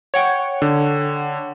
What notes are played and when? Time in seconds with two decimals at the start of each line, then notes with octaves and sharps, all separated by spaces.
0.14 C#5 F#5 G5
0.62 D3